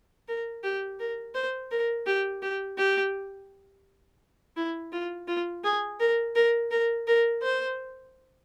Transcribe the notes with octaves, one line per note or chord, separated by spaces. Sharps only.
A#4
G4
A#4
C5
A#4
G4
G4
G4
E4
F4
F4
G#4
A#4
A#4
A#4
A#4
C5